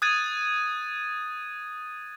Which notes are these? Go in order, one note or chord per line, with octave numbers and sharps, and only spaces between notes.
D#6 F#6 G#6 A6 D#7